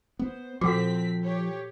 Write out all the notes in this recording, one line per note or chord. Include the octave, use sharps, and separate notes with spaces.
B3 C5
A#2 F3 C4 F#4 A4 F#5 B6
G4 C#5